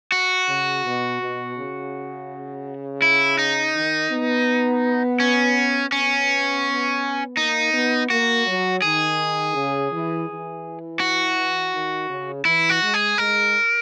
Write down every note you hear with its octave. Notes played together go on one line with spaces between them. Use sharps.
F#4
C#3
B2
B2
C#3
E4
D#4
D#3
B3
C#4
B3 C#4
A#3 D#4
B3
A#3 F#4
F#3
D#3 G#4
C#3
E3
E3
F#4
D#3
C#3
E3 E4
F#4
G#3
G#4
G#3 A#4